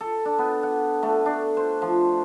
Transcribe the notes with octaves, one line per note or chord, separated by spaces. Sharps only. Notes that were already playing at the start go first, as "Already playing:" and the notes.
A4
D4
B3
F#5
A3
D4
C5
F3